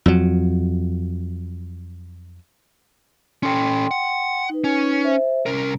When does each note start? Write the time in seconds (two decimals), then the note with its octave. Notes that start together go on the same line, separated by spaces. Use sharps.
0.06 F2 F#3
3.43 C#4 A4 G5 C6
3.91 F#5
4.50 D#4 B4
4.64 C#4
5.04 C5 E5
5.46 C2 C#4 A#4